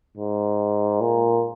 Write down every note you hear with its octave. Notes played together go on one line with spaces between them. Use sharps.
G#2
A#2